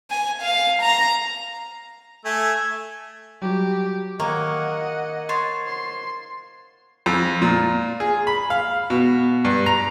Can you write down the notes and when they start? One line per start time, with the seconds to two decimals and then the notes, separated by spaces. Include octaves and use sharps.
0.11 G#5
0.42 F5
0.82 A#5
2.25 A3 E5 G#5
3.42 F#3 G3 F#4 G4
4.20 D#3 A#3 C#5 D#5 F#5
5.29 C5 C#5 A6
5.67 C6
7.06 F2
7.42 A#2
8.00 G#4
8.27 B5
8.50 F5
8.90 B2
9.45 G2
9.66 A#5